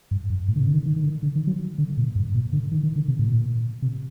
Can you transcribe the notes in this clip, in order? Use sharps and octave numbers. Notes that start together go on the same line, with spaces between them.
G2
F#2
A2
D3
C3
D3
D#3
D#3
D#3
D3
D3
D#3
F#3
D3
A#2
G2
A#2
D3
D#3
D#3
D3
C3
A2
A#2
C3